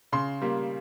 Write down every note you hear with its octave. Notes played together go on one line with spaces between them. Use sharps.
C#3 C6
G3 A#3